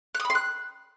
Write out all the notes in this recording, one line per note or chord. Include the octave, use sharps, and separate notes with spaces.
F#6
D#6
B5
C6
F#6